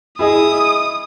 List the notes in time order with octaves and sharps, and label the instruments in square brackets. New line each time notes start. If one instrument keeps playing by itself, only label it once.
[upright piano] E4 G#4 D#5 [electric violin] D#6